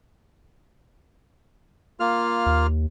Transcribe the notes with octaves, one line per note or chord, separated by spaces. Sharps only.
A#3 F4 F6
D#2